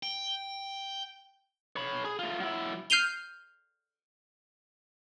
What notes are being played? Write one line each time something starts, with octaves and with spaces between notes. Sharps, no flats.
G5
C#5 B5
G#4
A3 F4
F#3 E4
F6 G6 C7 D#7 F7 G7